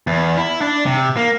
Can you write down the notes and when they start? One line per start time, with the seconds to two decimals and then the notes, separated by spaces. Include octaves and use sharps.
0.07 E2
0.37 E4
0.61 D4
0.86 C3
1.17 A#3